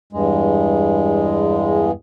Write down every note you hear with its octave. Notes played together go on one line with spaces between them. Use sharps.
E2 G2 G#3